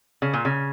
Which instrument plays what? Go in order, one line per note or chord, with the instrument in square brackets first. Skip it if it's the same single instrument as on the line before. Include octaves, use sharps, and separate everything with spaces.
[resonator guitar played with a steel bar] C#3
A#2
C#3